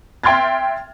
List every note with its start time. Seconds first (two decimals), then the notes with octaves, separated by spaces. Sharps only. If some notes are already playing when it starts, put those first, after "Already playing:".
0.24 E5 G5 C6 F6 G#6 A6